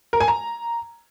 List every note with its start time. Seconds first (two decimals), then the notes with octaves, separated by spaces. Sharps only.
0.13 A#4
0.20 G#5
0.28 A#5